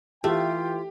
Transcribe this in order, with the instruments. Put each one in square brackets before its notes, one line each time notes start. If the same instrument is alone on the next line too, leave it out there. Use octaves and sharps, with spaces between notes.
[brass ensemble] E3 G5 [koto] A3 [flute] F4 [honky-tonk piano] G4